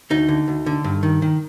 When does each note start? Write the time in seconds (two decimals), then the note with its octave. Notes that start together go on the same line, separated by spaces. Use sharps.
0.10 D2 D#4
0.29 D3
0.48 D2
0.66 D3
0.84 G2
1.03 D#3
1.22 D#3